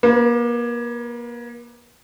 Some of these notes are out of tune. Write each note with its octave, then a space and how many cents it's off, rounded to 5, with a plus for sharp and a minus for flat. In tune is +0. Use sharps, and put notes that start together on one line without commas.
A#3 +35 B4 +10